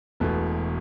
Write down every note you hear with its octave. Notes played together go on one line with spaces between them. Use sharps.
E1 E2 B2 A3